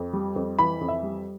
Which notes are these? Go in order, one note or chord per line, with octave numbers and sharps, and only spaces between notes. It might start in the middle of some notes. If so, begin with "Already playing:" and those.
Already playing: F2
G3
F2
E3 B5
F2
E5
G3